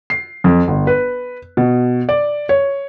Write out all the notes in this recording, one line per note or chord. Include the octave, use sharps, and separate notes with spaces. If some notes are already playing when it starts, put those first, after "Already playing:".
C7
F2
G1
B4
B2
D5
C#5